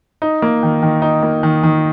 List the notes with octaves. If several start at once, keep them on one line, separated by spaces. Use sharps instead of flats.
D#4
A#3
D#3
D#3
D#4
A#3
D#3
D#3